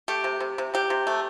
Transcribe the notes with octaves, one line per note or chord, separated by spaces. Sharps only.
A3 G4
C3
C3
C3
C3 G4
C3
A3